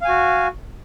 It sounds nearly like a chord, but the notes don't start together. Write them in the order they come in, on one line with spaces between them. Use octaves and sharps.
F5 G#5 F#4